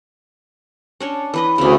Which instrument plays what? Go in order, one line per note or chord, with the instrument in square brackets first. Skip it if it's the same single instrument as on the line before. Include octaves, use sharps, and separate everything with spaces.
[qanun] C#4 D4 C#5
E3 B4 D#5
[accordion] D2 [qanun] C#3 C#4